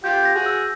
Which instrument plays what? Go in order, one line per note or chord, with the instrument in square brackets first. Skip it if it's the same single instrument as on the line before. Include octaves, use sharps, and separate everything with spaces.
[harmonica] F4 G4 [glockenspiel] G6
[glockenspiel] A#6
[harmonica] F#4 G#4
[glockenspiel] E6